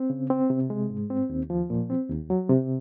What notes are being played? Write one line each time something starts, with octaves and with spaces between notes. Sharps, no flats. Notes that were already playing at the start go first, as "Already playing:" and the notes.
Already playing: C4
C#3
C4
C3
G#3
G#2
C4
D#2
F3
A#2
C4
D#2
F#3
C3